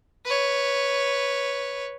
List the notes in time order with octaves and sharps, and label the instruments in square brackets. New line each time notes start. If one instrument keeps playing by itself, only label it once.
[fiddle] B4 C#5